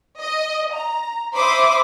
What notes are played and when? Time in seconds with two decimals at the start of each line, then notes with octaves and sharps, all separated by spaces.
0.21 D#5
0.74 A#5
1.33 C5 E5 B5 C6 D6 D#6